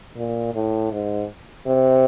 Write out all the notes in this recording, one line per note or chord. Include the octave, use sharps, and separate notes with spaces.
A#2
A2
G#2
C3